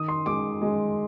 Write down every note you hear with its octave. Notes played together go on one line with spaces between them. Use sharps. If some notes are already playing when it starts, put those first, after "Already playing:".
Already playing: D#3 D#6
C6
G#3 D6
G#3